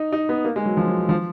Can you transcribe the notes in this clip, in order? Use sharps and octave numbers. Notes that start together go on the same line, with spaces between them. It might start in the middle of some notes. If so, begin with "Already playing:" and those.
Already playing: D#4
D#4
B3
A#3
G#3
F#3
F3
F#3
F3